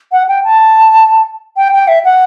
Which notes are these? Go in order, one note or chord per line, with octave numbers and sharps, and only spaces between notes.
F#5
G5
A5
G5
G5
E5
F#5